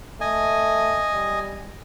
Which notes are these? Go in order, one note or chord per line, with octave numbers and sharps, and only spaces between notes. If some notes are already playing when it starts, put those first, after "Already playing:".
A3 D#5 G#5
G3